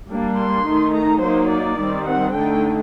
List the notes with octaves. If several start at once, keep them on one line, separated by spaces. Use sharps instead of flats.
G3 A#3 D4
C6
D#3 A3 D#4
A#5
F#3 A#3 D#4 C5
D5
D#3 G3 C4
F#5
D3 A3 D#4 G5